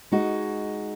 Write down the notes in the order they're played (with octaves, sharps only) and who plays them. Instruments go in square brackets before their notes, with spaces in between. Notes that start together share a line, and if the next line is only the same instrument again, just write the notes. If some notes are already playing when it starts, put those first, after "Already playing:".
[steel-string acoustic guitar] G#3 D#4 F#4